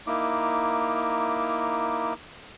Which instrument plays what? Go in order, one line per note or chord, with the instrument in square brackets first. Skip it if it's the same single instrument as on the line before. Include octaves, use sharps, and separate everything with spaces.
[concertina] A#3 D#4 E4 D6